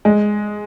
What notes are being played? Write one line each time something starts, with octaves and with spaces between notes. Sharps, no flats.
G#3